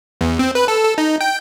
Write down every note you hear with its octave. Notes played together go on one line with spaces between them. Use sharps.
E2
C4
B4
A4
A4
D#4
G5